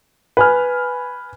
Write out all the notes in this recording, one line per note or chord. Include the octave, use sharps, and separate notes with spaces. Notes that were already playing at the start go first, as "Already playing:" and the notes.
B4 G#5 F6